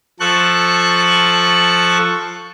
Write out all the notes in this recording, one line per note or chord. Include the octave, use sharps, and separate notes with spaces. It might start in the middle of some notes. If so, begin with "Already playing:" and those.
F3 A4 C#6 F#6